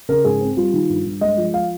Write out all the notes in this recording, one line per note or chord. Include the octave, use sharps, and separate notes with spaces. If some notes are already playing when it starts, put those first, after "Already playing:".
C#3 A#4
G#2 G#4
C4
G3 F4
D#3
G2
G2
G#3 D#5
F3
F5